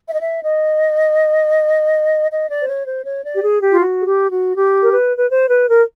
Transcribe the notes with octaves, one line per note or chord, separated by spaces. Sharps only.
E5
D#5
E5
D#5
D#5
D5
C5
C#5
C5
C#5
D5
G4
G#4
G4
F4
F#4
G#4
G4
F#4
G4
A#4
B4
B4
C5
B4
A#4